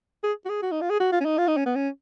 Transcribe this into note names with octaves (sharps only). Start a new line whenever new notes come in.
G#4
F#4
G#4
F#4
D#4
F4
G#4
F#4
F4
C#4
D#4
F4
D#4
C#4
B3
C#4